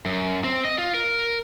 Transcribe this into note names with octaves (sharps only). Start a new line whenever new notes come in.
F#2
C4
D#5
F4
A#4